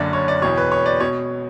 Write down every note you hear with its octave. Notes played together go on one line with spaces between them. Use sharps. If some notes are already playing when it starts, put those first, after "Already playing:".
Already playing: F#1 F#2 D3 D5
C#5
D5
E1 E2 B2 C#5
B4
C#5
D5
B2 C#5